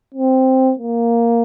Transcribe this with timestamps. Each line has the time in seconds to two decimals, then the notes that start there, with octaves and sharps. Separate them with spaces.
0.15 C4
0.79 A#3